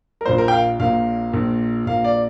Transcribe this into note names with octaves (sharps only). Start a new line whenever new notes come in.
A#4
A#1 A#2 A#3 C5
A#4
G5
F5
A#1 A#2 A#3 F5
A#1 A#2 A#3
A#1 A#2 A#3 F5
D5